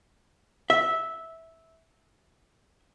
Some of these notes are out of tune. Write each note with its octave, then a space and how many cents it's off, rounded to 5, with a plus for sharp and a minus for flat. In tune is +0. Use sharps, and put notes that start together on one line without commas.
E5 -10